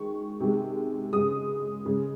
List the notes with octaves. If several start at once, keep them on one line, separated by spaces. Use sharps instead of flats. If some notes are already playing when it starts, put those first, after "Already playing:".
Already playing: D#3 G#3 C#6
C3 D#3 G#3
C#3 G#3 D#6
C#3 G#3